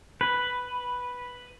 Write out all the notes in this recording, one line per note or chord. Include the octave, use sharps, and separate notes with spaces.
B4